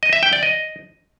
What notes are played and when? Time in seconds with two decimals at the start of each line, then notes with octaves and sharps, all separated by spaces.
0.03 D#5
0.13 E5
0.23 G5
0.33 D5
0.43 D#5